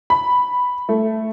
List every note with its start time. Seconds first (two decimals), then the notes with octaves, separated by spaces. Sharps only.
0.10 B5
0.89 A3